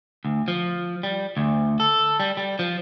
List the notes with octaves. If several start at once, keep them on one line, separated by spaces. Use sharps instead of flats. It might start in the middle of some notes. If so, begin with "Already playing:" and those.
D2
F3
G3
D2
A4
G3
G3
F3